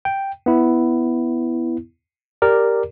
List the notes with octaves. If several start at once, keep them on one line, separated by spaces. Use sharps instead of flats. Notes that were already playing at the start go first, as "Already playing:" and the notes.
G5
B3 E4
G4 A#4 D5